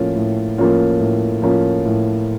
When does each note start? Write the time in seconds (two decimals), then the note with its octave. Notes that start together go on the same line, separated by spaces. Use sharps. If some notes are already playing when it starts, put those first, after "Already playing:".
Already playing: A2 F3 A#3 C#4 F4
0.16 A2
0.58 F3 A#3 C#4 F4
1.00 A2
1.42 F3 A#3 C#4 F4
1.85 A2